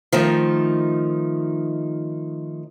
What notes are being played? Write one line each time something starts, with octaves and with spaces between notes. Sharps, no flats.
D#3 F3 A3 D#4